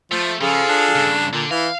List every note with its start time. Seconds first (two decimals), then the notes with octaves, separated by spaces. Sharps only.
0.11 F3 A3
0.41 C#3 F3 G#4 A4 F5
0.69 D4
0.95 G2 C#3
1.33 A#2 D3
1.51 E3 E4 F5